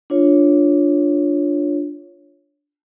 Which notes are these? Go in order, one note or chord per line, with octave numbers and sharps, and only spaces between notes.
D4 F4 C#5